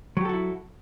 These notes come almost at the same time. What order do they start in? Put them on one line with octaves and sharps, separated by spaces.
F#3 G4 A4 F#4 E4